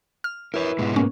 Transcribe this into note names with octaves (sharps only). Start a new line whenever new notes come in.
F6
E4 A#4 B4 C#5
G#2 B2 G#3
A#3 B3 C#4